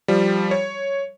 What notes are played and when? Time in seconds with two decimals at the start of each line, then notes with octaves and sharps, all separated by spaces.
0.08 F3 G3
0.51 C#5